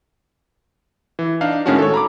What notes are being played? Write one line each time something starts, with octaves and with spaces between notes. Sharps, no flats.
E3
D4 D#4 F5
A2 D#3 G#3 C#4 D4 F#4
A4 C#5
A#5 B5 D6